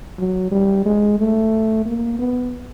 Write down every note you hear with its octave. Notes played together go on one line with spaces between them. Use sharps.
F#3
G3
G#3
A3
A#3
B3